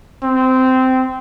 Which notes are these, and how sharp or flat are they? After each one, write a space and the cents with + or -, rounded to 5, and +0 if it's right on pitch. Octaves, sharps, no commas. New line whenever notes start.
C4 -15